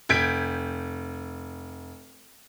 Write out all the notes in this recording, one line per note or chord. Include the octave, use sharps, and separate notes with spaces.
F1 G6 G#6 B6 D7